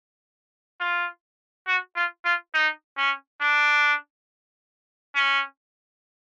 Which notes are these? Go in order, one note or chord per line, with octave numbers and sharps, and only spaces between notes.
F4
F#4
F4
F4
D#4
C#4
D4
C#4